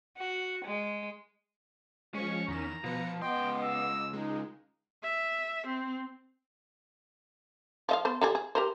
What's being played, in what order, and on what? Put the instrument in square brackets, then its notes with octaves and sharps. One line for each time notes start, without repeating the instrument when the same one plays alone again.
[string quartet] F#4
G#3
[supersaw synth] F3 G#3 [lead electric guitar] C#4 [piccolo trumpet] C#6
[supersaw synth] E2 D#3 E7 [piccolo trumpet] A#5
[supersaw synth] B2 B4 C#7 [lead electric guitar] F3
[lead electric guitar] C#2 C6 [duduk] B3 [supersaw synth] D#5 D6 [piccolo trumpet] G5
[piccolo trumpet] E6
[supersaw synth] G#3 [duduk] D#4
[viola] E5
C4
[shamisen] F3 D#5 F5
B3 C5
D3 G3 G#4
G#4
G4 A#4 C5